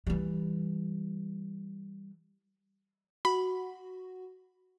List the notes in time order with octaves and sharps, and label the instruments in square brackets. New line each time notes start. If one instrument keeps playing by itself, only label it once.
[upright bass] E3 G3
[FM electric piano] F#4 [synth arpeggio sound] B5